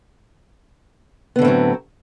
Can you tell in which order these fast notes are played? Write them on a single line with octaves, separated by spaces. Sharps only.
B3 D3 A2 C4 F#3